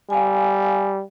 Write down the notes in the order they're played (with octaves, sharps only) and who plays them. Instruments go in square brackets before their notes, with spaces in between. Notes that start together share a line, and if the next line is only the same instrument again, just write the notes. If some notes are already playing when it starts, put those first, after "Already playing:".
[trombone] G3 [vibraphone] F5 G#5